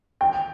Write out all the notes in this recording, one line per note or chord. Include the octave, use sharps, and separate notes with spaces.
G5